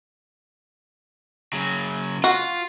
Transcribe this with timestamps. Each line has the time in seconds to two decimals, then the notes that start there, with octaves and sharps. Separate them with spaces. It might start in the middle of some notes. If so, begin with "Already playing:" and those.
1.53 C#3 F#3
2.24 F4 F#4